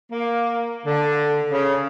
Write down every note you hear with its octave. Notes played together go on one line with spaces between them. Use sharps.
A#3
D3
C#3